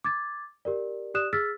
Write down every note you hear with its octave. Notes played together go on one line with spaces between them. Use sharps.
D6 G#6 A6
G4 A#4 D5
G4 D5 D#6 F#6 E7
G#4 E6 F6 A6 B6